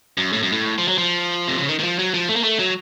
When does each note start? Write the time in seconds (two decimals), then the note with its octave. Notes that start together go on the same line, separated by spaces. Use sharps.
0.17 F#2
0.33 A2
0.43 F#2
0.52 A2
0.78 F3
0.88 F#3
0.98 F3
1.48 C3
1.58 C#3
1.69 D#3
1.79 D#3
1.83 F3
1.99 F#3
2.14 F3
2.29 A3
2.36 A#3
2.43 A3
2.59 F#3